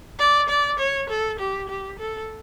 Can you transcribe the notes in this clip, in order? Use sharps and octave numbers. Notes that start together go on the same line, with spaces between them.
D5
D5
C#5
A4
G4
G4
A4